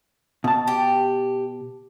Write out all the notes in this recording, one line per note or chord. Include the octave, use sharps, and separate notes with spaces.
B2 A5
G4